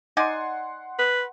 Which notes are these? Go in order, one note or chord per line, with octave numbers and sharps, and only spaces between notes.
D#4 D5 F#5 G#5 C6
B4